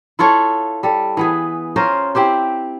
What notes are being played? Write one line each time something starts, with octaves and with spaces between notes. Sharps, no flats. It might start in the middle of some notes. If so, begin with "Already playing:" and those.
E4 F4 A4 C#5
G3 A4
E3 B3 G#4
C#4 F4 A#4 C5
C4 E4 G4 C5